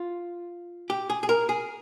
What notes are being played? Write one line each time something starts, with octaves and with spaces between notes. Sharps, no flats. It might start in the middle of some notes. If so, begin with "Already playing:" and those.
Already playing: F4
G4
G#4
G#4
A#4
G#4